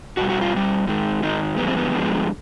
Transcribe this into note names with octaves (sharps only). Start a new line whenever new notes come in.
B2 G3 F#4
F#4
F4
B2 G3
G#2 D#3 G#3
G#2 D#3 G#3 D#4
G2 D3 F3 G#3 B3
C4
B3
G2 D3 F3 G#3